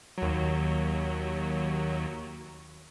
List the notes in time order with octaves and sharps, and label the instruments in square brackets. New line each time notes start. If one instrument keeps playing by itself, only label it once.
[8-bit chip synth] D#2 F#3